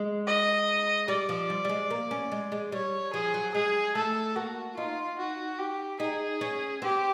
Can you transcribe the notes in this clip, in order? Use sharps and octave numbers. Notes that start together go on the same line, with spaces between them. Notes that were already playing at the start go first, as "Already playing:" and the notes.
Already playing: G#3
D#5
G3 D5
F3
G3
G3
G#3
A#3
C#4
G#3
G#3
G3 C#5
F3 G#4
F#3
G#3 G#4
A3 A4
A#3 F#4
D#4 F4
F#4
G4
D#4 G#4
C#4
C4 G4